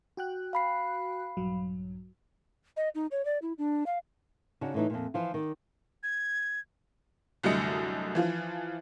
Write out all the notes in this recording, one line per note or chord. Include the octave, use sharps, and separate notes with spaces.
F#4 G5 F#6
F5 B5 C7
A#1 G2 F#3
D#5
D#4
C#5
D5
E4
D4
F5
C#3 D4 D#4 F#4
A2 E3 D#4
F2 A#2
E3 F3 F4
D#3 D5
G#6
C2 F#2 D3 A3 D#5 C#7
E3 F3 F4